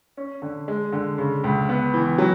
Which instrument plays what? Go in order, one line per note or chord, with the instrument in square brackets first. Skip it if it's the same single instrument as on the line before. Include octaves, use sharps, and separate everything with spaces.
[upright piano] C#4
D3
G#3
D3
C#3
C#2
B3
E3
F#3